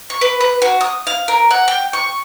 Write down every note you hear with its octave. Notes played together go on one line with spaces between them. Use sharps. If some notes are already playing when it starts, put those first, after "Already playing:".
C#6
B4
B4
F#4
D#6
F5
A#4
F#5
G5
C#6